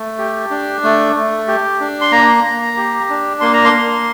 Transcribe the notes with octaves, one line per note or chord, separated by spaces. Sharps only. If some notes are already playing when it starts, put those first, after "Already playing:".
Already playing: A3
G4
D4
A3
A3
G4
D4
C6
A#3 A#5
A#3
G4
D4
A#3 C6
A#5
C6
A#3